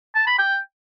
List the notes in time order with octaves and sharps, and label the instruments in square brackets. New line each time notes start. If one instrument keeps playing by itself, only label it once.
[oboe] A5
B5
G5